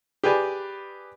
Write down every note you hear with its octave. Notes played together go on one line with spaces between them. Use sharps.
G4 G#4 B4 D5 G#5